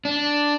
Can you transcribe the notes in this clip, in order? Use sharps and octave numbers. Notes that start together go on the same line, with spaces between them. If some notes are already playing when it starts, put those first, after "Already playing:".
D4